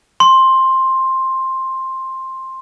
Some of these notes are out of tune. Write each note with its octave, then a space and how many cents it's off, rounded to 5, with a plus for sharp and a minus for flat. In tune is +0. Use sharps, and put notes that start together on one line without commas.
C6 +10